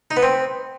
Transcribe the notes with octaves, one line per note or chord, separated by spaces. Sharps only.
D#4
B3
C4